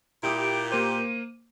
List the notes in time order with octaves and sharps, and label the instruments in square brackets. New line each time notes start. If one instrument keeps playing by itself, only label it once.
[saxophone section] A#2 G4 [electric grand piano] E4 D#6 [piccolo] D7
[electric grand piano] A#3 C5 [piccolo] D#7